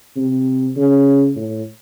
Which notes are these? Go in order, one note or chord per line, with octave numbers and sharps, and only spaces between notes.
C3
C#3
A2